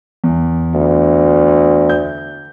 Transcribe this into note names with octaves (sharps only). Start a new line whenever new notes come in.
E2
D2
G6